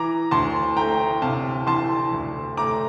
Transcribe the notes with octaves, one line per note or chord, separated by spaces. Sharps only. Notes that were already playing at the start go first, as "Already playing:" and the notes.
Already playing: E3 A#5 D6
D2 A5 C6
A3 G5 A#5
C3 F5 A5
E3 A5 C6
D2
A3 A#5 D6